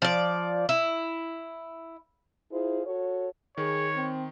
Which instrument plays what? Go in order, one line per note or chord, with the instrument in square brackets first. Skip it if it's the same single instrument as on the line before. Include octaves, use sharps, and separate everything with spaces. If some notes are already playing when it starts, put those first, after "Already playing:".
[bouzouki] F3 D5
E4
[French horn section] E4 F4 G#4 C5
F#4 A4 C#5
[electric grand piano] D#3 [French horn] G#4 [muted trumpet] C#5
[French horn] C4